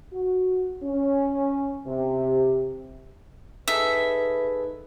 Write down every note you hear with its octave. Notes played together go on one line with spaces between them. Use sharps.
F#4
C#4
C3
D#4 G#4 A4 B4 E5